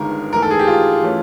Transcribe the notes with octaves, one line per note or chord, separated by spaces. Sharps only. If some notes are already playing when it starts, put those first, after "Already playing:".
Already playing: G1 G2 D#3 G#3 A#4
G#2 E3 A3 A#4
A4
G#4
G4
F4
E3 A3 C#4